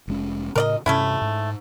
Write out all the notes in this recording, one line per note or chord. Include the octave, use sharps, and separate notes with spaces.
F1 G#3 C#4
A2 C#3 A#4 D5 D#5
G2 C3 A3 C#4 E4
G#2